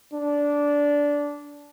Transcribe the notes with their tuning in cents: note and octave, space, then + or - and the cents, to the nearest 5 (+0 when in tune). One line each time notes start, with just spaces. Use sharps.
D4 -15